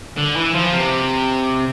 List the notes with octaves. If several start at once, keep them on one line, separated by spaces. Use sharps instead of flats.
D3
E3
F3
C3